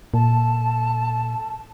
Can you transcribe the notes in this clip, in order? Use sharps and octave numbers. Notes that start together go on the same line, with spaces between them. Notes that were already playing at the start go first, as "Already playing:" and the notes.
A#2 A4 A5